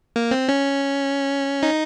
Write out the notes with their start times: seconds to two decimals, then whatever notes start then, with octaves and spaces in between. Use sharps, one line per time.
0.16 A#3
0.31 C4
0.49 C#4
1.63 D#4